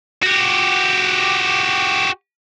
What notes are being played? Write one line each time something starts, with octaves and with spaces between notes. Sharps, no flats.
F#4 G4